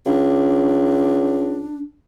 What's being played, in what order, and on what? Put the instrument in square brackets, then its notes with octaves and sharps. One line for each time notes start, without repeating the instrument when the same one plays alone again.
[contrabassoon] C#2 [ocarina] D4